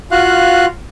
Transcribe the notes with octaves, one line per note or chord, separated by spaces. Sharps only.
F4 F#4 F5 F#6